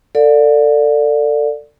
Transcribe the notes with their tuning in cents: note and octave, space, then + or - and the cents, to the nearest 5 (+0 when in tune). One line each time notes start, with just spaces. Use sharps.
A4 +30 D5 +0 F5 +45